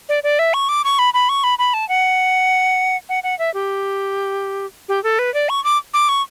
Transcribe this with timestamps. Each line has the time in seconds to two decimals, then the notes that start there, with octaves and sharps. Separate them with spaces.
0.09 D5
0.23 D5
0.39 E5
0.54 C#6
0.69 D6
0.84 C#6
0.99 B5
1.14 B5
1.29 C#6
1.44 B5
1.59 B5
1.74 A5
1.89 F#5
3.09 F#5
3.23 F#5
3.39 E5
3.54 G4
4.88 G4
5.03 A4
5.19 B4
5.34 D5
5.49 C#6
5.64 D6
5.94 D6
6.09 C#6